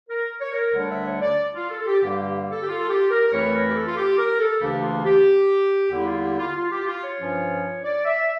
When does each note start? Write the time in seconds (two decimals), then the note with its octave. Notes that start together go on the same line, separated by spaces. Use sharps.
0.09 A#4
0.41 C#5
0.52 A#4
0.73 D2 D3 G3 D4 C#5
0.90 E5
1.06 C#5
1.22 D5
1.54 F4
1.70 A4
1.81 A4
1.86 G4
2.03 G2 D3 G3 A#3 G4
2.19 G4
2.51 A4
2.62 G4
2.67 F4
2.80 A4
2.89 G4
3.10 A#4
3.27 A#4
3.32 F2 E3 A3 E4 C#5
3.53 A#4
3.70 G4
3.74 A4
3.87 F4
3.96 G4
4.18 A#4
4.39 A4
4.61 D2 C#3 E3 A#3 D4 G4
4.83 F4
5.04 G4
5.90 E2 D3 G3 A#3 E4 G4
6.06 F4
6.22 G4
6.39 F4
6.55 F4
6.71 G4
6.87 F4
7.03 C#5
7.19 G2 F3 C#4 F4
7.83 D5
8.05 E5